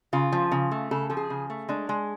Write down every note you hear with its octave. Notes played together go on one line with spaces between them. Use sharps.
C#3 F4
F3
C#3
A3
C#3 A4
F3 A4
G#4
C#3
A3
G#3 D4
G#3